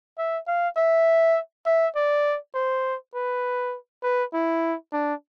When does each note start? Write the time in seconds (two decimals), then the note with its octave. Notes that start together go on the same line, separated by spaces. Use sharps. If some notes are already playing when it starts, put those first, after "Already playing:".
0.18 E5
0.47 F5
0.77 E5
1.66 E5
1.96 D5
2.54 C5
3.14 B4
4.03 B4
4.34 E4
4.93 D4